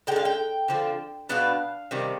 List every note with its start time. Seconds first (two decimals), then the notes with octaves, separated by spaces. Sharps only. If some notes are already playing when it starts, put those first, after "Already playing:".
0.07 D3 G#3 D4 G5
0.16 F5
0.25 G5
0.68 D3 F3 C4
1.29 B2 B3 D4 F5
1.91 C3 D#3 G3